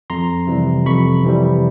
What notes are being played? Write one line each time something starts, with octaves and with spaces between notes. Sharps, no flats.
F2 A#5 C6
C3 E3 G3
F2 B5 C#6
C3 E3 G3